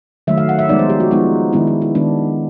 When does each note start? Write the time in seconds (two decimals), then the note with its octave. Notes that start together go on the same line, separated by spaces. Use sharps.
0.27 D#3 F#3 A3 E5
0.38 F5
0.49 F#5
0.59 E5
0.69 F3 G#3 B3 D#4 D5
0.79 C5
0.90 G4
1.00 F#4
1.11 F3 G#3 B3 D#4 F4
1.53 D#3 G#3 B3 D4 E4
1.67 E4
1.82 E4
1.95 D#3 G#3 B3 D4